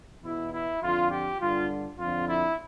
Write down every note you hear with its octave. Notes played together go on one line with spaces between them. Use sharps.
E2 B2 E4
E4
F2 D3 F4
G4
G2 D3 F4
F2 D3 F4
E4